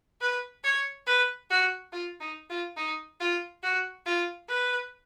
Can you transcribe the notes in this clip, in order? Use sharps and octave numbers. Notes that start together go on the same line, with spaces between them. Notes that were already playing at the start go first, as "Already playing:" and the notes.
B4
C#5
B4
F#4
F4
D#4
F4
D#4
F4
F#4
F4
B4